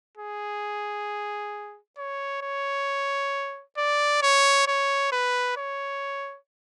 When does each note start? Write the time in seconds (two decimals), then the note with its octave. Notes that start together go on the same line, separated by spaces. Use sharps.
0.18 G#4
1.98 C#5
2.42 C#5
3.78 D5
4.22 C#5
4.68 C#5
5.12 B4
5.57 C#5